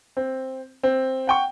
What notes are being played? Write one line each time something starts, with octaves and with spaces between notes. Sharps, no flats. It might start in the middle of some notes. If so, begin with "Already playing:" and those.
C4
C4
F#5 G5 C#6